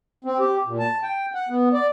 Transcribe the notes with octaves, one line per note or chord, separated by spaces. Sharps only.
C4
G4
A#2
A5
G5
F#5
B3
D5